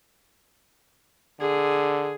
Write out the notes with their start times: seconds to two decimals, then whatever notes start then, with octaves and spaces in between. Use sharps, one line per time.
1.41 D3 G#4